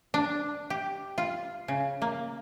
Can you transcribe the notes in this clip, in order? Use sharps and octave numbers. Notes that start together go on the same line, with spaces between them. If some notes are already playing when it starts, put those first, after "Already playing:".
D4
G4
F4
C#3
A#3